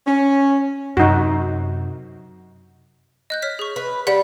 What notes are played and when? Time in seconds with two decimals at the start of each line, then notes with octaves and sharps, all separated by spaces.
0.07 C#4
0.97 F#2 C3 D#4 F#4
3.30 D#5 F#6 G6
3.42 C#5 F6 B6
3.59 G#4 C#6
3.76 B4
4.07 G3 F#5